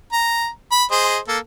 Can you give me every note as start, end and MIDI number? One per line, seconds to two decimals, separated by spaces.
0.13 0.48 82
0.71 0.84 83
0.91 1.18 68
0.91 1.18 72
0.91 1.18 75
1.28 1.38 58
1.28 1.38 69